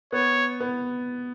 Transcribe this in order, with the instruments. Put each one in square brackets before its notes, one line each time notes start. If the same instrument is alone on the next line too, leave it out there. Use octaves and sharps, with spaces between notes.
[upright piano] B3 [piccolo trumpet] C#5
[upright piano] B3